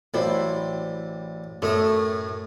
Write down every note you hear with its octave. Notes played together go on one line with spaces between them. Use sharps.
A1 F#3 G3 E4 C5
F#2 A2 A3 D#5